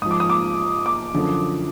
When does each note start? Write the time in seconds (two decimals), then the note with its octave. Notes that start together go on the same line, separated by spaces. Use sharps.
0.02 G#2 F3 D#6
0.11 D6
0.20 D#6
0.30 D6
0.86 D6
1.14 F#2 D3 F3